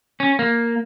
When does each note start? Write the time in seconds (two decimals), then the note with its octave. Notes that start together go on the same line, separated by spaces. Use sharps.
0.20 C#4
0.39 A#3